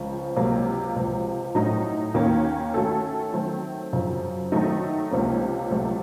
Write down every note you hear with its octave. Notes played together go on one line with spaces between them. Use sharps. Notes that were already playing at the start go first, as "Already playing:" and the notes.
Already playing: C#2 C#3 F3
C#2 C3 F#3 A#3
C#2 C3 F3
A2 F#3 A3 D#4
D#2 D#3 A#3 C#4
D#3 A3 C#4 F#4 A4
D#3 F#3 A3 C4
F#2 C#3 F3
D#3 F#3 A3 D#4
C#2 C3 F3 A#3 C#4
C#2 C3 F#3 A3